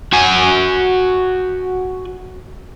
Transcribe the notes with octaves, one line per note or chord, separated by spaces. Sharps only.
F#4 G#5